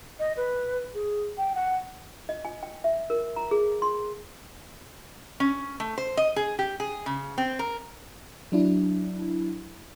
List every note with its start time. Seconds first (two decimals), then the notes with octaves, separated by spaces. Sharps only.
0.19 D#5
0.37 B4
0.94 G#4
1.38 G5
1.55 F#5
2.29 D#5
2.45 G#5
2.63 G5
2.84 E5
3.10 A#4
3.36 A#5
3.51 G#4
3.82 C6
5.40 C#4
5.80 A3
5.98 C5
6.17 D#5
6.36 G#4
6.59 G4
6.80 G#4
7.06 C#3
7.38 C4
7.59 A#4
8.52 F#3 D4 E4